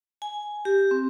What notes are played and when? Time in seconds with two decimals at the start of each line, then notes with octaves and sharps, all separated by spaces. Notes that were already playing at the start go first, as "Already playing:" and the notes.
0.22 G#5
0.65 G4
0.91 C4